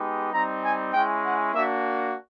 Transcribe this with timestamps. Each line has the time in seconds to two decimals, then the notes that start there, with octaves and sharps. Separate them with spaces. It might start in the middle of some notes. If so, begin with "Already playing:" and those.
Already playing: G#3 B3 D#4 G4
0.33 G3 C4 D#4 A#5
0.63 G#5
0.93 G#3 C#4 E4 G5
1.24 F#5
1.54 A#3 D4 F#4 E5